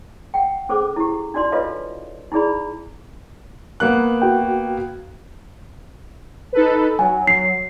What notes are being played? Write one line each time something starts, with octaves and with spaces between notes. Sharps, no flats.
F#5 G5
C#4 G#4 A4 C5 D6
E4 G4
D4 D#4 F#4 D5 C6
F4 A4 B4 C#5 D#5 F5
D#4 E4 G#4 D5 B5
A#3 B3 F#6
F#4 G5
D#4 A4 B4
F#3 G#5
C7